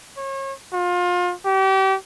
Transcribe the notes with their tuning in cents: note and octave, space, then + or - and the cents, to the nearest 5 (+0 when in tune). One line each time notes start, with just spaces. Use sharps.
C#5 -35
F4 +30
G4 -35